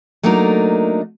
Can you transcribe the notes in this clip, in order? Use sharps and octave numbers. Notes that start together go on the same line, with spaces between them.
F#3 A3 A#3 D4 D#4 A#4